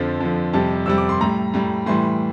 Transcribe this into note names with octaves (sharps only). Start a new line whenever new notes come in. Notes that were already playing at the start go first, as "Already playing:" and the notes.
Already playing: F2 D3 F3
F2 D3 F3
F2 C3 G3 A5
F2 C3 G3 E6
D6
C6
A2 G3 A#5
A2 G3
A2 E3 G3 C6